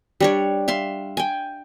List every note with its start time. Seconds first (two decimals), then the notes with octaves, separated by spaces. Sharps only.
0.20 G3 D4 C#5
0.68 E5 F5 C6
1.17 G5 G#5